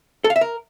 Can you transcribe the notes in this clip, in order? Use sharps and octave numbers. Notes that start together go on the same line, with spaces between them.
A4
F5
E5
A#4